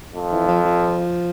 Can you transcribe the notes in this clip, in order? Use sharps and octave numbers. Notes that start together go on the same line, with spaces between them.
F2
E3
F3
F3